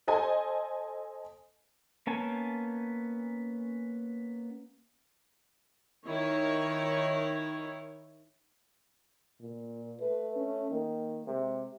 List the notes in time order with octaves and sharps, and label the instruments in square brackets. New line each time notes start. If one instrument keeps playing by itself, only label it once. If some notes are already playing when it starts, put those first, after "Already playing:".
[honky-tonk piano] A4 C5 D#5 G#5
[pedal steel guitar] A#3 B3 C#4 G#5 A5
[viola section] D#3 E4 C#5
[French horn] A#2
[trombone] A3 [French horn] B4
[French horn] C#4
[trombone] D#3 [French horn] A#3
[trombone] C3 [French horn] G#3